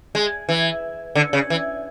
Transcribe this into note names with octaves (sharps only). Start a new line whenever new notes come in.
G#3
E3
D3
C#3
E3